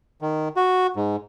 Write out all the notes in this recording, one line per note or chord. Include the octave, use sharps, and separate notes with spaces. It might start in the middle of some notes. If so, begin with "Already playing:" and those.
D#3
F#4
G#2